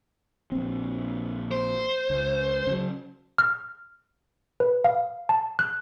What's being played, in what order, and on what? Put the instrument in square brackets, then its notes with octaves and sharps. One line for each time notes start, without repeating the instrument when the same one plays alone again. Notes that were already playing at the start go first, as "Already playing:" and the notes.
[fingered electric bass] A#1 C4
[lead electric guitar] C5
[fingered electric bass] C#2
C#3 F#3
[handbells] F6
B4
F5
A5
F#6